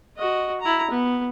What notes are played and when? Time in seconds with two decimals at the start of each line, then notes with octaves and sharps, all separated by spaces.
0.17 F#4 D#5
0.61 E4 A#5
0.91 B3